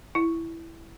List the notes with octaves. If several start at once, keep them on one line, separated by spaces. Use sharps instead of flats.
E4